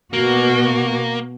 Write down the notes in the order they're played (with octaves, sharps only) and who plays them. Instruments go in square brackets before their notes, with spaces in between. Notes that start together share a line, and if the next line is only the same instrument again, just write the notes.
[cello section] B2 F#4 [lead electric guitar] A#3